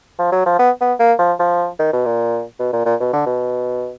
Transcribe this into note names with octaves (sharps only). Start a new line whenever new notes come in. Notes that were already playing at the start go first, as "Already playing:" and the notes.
F3
F#3
F3
B3
B3
A#3
F3
F3
D#3
B2
A#2
B2
A#2
A#2
B2
D3
B2